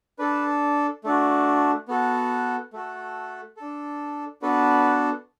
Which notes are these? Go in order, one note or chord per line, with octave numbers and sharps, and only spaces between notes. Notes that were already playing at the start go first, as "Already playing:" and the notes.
D4 A4 B4
A3 D4 F#4
B3 F#4 A4
A3 F#4 A4
D4 A4
B3 D4 F#4 A4 B4